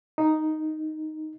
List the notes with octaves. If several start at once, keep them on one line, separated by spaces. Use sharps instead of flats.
D#4